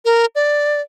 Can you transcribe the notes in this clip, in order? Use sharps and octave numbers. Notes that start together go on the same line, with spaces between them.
A#4
D5